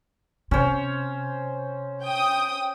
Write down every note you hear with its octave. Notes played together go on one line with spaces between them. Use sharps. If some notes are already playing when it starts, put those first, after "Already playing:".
C3 C#4 C5 C#5
G5 D#6